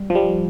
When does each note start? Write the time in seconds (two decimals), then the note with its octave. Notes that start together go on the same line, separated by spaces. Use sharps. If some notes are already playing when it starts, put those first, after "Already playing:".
Already playing: G3
0.10 F3
0.15 G3